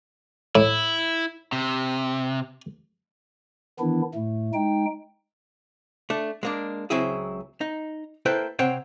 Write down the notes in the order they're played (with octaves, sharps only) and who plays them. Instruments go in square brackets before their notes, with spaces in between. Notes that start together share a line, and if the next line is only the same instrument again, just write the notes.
[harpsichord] A2 [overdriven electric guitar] E4
[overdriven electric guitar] C3
[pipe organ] D#3 E3 B3 D4 E4
A2 A3
G#3 D#4 G5
[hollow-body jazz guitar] A3 D4
G#3 A#3 D4
C#2 F#3 C4 E4 G#4
D#4
A#3 E4 A4 B4 C5 G5
C3 C4 C5 C#5 F#5 G5